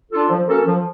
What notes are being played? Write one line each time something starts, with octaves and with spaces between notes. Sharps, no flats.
D4 F4 A4
F3
A#3 C#4 F#4 A4
F3